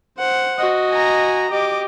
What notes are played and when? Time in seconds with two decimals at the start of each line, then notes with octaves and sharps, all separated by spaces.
0.18 C5 F#5
0.58 F#4 D#5
0.90 G#5 A#5
1.50 G4 D#5 D6